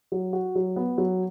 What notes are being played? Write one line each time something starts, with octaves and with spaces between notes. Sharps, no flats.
F#3
F#4
F#3
B3
F#3